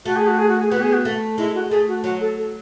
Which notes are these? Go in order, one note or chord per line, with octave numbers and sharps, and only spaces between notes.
A3 F#4
G#4
F#4
G#4
F#4
G#4
B3 F#4
G#4
F#4
A3
G#3 E4
F#4
A3 G#4
F#4
F#3 F#4
A4
A4